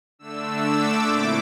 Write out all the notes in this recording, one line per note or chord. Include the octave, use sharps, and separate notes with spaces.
D3 A3 D4 E6
D6
A#2 A3 C4 E4